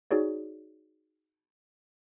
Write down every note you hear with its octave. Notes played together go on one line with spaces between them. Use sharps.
D#4 F#4 G#4 C#5 D5